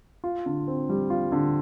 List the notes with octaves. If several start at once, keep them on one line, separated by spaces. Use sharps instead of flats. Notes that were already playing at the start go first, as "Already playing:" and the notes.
F4
D3
C4
G3
F4
D3